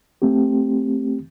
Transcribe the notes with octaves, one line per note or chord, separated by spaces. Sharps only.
A3 C4 G4